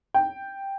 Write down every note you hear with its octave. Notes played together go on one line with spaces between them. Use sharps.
G5